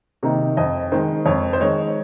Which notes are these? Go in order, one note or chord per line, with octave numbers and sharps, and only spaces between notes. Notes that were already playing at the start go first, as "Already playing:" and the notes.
C3 D#3 A#3 D#4
F2 D#5
D#3 G#3 C5
F2 C#5
C5
D#3 G#3 C#5